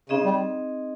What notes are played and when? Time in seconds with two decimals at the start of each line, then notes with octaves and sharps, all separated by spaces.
0.09 C#3 C4 D#4 G#4 D#5
0.25 G3